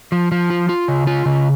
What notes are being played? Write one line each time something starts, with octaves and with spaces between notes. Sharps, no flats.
F3
F3
F4
F4
C#3
F4
C#3